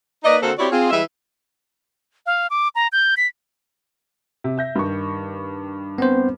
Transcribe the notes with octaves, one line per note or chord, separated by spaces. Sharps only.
A#3 D#4 B4 D5 D#5
D3 A#3 C4 F#4 A4
C4 E4 F#4 G4 C#5 D5
C4 F4 G#4
E3 G3 G#3 E5
F5
D6
A#5
G6
B6
C3
E5 G6 A#6
G2 D#3 C#6
B3 C4 C5